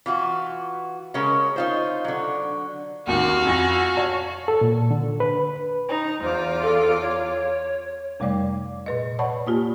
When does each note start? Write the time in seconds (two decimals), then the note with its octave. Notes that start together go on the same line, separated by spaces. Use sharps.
0.06 E3 F4 F#4
1.14 C#3 G#3 C#4 A#4
1.56 D#4 F4 C5
2.05 D3 F#3
3.07 A1 D#2 F#4 F5
3.45 F2 G#5 A#6
3.96 C#5 A5
4.48 A4
4.61 A#2
4.91 D3
5.20 B4
5.90 D#4 A#5
6.22 E2 F4 C5 D6
6.62 A4
7.01 C#5
8.20 F2 C3 G3 A3 D5 D6
8.86 A#2 B4 D#5
9.19 C#5 D5 F#5 A5 B5 C#6
9.47 A#3 F4 G4